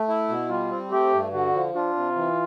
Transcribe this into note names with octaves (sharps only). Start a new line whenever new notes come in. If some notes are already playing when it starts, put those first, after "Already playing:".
Already playing: A3
E4
B2
G3 F4
C4
A3 G4
G2
D3 F#4
F3
D4 F4
C3
E3